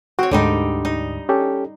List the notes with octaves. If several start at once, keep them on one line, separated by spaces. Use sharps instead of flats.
C4 F#4 C#5
D2 G#2 D3 G3 D#4
D#4
C#4 G4 A4